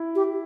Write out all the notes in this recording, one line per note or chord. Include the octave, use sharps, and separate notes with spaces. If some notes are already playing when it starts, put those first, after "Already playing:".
Already playing: E4
G4